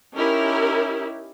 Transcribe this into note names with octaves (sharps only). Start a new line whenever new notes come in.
C#4 D#4 E4 G4 A#4